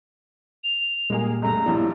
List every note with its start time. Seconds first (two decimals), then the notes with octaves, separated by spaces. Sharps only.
0.63 F7
1.10 A#2 G3 G#3 A#3 G#4
1.42 C#2 G2 A3 A#5
1.66 B1 F3 G3 E4